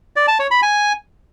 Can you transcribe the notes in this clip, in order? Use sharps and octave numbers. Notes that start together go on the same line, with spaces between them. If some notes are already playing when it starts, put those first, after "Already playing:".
D5
A5
C#5
B5
G#5